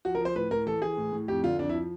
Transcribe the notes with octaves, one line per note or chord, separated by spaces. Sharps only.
F3 F#4
A#4
F3 C5
A2 B4
A2 A#4
E3 A4
E3 G#4
A2
A2
F2 G4
D3 F4
F2 D4
E4
F3